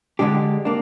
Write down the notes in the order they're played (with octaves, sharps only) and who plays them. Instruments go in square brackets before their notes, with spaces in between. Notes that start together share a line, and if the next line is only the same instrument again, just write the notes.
[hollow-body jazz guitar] D3 G#3 D4 G4
A#3 D4